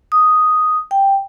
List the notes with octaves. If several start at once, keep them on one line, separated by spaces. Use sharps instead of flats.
D#6
G5